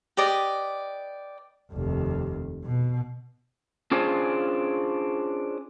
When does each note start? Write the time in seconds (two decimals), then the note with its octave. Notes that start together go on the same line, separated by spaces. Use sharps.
0.17 G4 B4 D5 D#5
1.72 F1 D#2
2.65 B2
3.91 C#4 D4 F4 G#4 C5